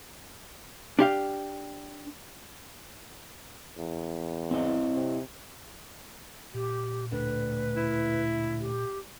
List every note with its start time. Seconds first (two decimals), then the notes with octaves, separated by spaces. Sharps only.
0.99 D4 G4 F5
3.78 E2
4.51 C4 E4 D#5
4.94 C3
6.54 A#2 G4
7.11 D2 A2 D4 B4
7.76 E4
8.60 G4